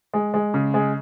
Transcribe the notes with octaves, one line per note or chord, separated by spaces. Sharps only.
G#3
G#3
C#3
G#3